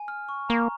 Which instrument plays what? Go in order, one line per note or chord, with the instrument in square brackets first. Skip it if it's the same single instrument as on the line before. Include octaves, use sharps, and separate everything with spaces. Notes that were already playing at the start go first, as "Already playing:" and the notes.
Already playing: [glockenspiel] G#5
F6
C#6
[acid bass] A#3 [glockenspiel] A#5